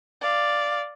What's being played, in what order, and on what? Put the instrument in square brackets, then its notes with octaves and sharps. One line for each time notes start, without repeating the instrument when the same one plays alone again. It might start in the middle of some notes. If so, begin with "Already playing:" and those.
[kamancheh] D5 F5